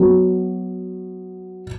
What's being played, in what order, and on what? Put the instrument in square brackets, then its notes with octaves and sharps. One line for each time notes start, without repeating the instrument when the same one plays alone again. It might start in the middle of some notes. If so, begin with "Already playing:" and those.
Already playing: [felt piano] F#3 B3 F#4